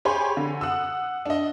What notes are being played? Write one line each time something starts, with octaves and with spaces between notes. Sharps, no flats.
G4 G#4 C#5 G#5 B5 C6
D3
F#5 D#6 E6
D4 D#5